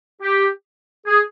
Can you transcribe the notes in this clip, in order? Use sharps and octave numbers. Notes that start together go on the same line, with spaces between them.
G4
G#4